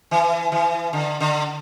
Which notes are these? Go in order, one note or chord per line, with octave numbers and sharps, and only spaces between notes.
E3
E3
D3
D3